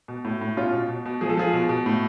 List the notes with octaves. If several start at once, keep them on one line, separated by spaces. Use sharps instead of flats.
B2
A2
A2
B2 C#4 F4
B2
B2
B2
F3 G#4
A4
F3 F4 G#4
B2
B2
A2